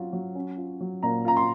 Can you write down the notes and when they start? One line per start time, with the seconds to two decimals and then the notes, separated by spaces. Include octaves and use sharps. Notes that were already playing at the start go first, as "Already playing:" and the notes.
Already playing: F#3 F4
0.13 F#3
0.35 C#4
0.57 F4
0.80 F#3
1.03 A#2 A#5
1.25 F4 A#5
1.37 C6